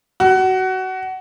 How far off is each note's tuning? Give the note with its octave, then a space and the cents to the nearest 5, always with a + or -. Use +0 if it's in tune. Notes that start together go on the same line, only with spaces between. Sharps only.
F#4 +20